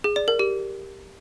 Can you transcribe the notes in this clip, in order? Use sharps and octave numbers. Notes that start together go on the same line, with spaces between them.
G#4
D5
A#4
G4